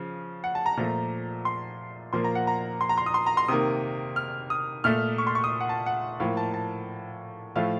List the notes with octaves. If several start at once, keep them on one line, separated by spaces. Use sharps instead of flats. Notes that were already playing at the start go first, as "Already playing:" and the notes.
Already playing: C#3 F3
F#5
A5
A#5
A#2 F3 A3
C6
A#2 F3 A#3 C6
A#5
F#5
A#5
C6
A#5
C6
D#6
C6
A#5
C6
C3 D#3 A#3 D#6
F6
D#6
A#2 A3 F6
C#6
C6
C#6
D#6
F#5
A5
F#5
A2 F3 A#3 F5
A5
A5
A2 F3 A3 F5